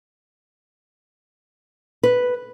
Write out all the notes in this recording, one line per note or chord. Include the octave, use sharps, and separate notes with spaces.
B4